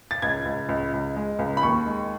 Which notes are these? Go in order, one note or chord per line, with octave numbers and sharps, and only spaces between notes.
A6
C#2 G#6
C#2
C#2
C#2
G#3
C#2
B5
D#2 C#6
G#3